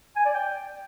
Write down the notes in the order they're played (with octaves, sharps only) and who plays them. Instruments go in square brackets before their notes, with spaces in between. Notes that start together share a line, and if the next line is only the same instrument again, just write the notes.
[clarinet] G#5
D5
G5